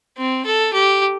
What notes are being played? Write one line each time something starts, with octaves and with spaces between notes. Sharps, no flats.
C4
A4
G4